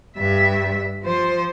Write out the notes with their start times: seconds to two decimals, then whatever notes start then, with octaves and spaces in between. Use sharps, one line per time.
0.17 G2 E5
1.02 F3 C5